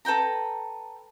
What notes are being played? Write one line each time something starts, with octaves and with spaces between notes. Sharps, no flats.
A4 B4 G5 A#5